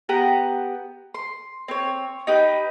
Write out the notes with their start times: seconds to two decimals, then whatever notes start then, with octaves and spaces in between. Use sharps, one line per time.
0.09 B3 G4 F#5 A#5
1.15 C6
1.68 C4 C#5
2.27 D#4 G4 B4